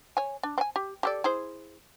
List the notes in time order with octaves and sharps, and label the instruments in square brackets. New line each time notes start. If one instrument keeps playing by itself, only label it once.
[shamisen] C#5 G#5
D4
C4 G#5
G4
G4 A4 D5
E4 G#4 C5